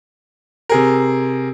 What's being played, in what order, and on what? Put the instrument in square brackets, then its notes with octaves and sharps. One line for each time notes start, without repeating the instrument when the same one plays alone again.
[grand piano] C3 G#4 A#4